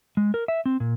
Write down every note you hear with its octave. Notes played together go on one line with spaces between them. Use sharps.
G#3
A#4
E5
C4
A#2